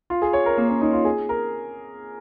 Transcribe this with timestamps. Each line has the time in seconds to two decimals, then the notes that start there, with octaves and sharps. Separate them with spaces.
0.10 F4
0.22 G#4
0.33 C#5
0.46 A#4
0.58 A#3
0.69 C#4
0.81 D#4
0.93 F4
1.05 G#4
1.29 A#4